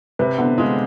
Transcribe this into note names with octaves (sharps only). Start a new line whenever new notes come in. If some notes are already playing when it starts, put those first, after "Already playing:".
C3 B4
D3 B3
G#3 F4